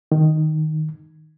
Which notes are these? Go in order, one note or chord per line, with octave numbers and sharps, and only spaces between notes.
D#3